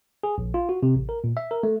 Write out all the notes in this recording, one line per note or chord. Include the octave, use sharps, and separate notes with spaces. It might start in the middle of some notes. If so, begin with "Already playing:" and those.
G#4
A#1
F4
F#4
C3
A1
A#4
A#2
E5
A#4
A3